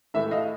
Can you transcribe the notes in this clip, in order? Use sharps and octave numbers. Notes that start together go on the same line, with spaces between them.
A2 E3 A3 E5
D#5 F5